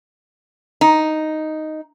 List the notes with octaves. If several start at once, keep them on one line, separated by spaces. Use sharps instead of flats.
D#4